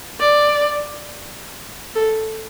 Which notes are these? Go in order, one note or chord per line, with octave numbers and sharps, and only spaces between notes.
D5
A4